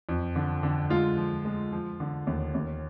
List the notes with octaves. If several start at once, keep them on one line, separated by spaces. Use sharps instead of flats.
F2
D3
D3
G#3 F4
F3
G#3
F3
D3
D#2
D#2